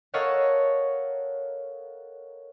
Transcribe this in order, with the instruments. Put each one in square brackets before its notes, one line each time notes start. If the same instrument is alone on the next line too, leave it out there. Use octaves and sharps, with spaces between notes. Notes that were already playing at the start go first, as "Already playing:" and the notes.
[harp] A4 A#4 C#5 D#5 F5 F#5